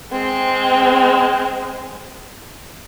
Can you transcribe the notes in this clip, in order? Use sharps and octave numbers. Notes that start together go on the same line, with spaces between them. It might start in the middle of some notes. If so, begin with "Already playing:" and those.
G#3 C4